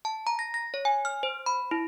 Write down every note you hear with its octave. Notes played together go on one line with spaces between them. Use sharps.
A5
A#5
A#6
A#6
C#5
G#5
F6
C5
B5
E4